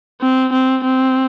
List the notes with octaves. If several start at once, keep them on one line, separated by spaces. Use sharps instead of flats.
C4
C4
C4